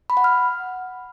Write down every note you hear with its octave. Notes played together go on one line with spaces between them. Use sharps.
B5
F#5
F6